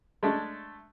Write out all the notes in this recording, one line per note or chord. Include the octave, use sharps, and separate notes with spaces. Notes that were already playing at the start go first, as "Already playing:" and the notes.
G#3 A3 D4